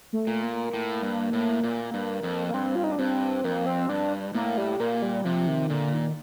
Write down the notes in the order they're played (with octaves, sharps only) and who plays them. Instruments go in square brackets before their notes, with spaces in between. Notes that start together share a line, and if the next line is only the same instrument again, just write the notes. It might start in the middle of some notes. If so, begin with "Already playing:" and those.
[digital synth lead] A3
[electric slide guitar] A#2
[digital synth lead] A#3
[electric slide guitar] A2
G2
A2
A#2
G2
F2
[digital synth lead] A#3
[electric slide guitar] G2 [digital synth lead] C4
[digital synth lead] F4
D#4
D4
[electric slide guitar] G2 [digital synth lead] C4
[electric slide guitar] F2 [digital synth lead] A#3
[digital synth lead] C4
[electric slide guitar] G2 [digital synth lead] D4
[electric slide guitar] A2 [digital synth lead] A#3
[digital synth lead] G3
[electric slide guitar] A#2 [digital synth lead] A#3
[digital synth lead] G3
[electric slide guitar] C3 [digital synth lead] F3
[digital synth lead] D#3
[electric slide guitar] A#2 [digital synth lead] D3
[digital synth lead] D#3